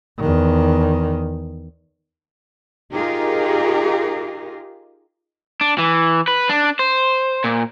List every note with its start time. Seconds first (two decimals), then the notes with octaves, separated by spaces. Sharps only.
0.19 E2 D#3
2.91 D#4 F4 G4 G#4 A#4
5.61 D4
5.78 E3
6.28 B4
6.49 D4
6.79 C5
7.44 A#2